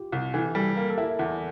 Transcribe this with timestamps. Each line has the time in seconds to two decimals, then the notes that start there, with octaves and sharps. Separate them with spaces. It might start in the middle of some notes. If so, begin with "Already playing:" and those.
Already playing: F4 G4
0.12 C2
0.34 E3 A4
0.55 G3 A4
0.76 A#3 A#4
0.90 A4
0.98 E4
1.19 E2